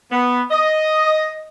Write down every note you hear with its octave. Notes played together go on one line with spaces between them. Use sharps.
B3
D#5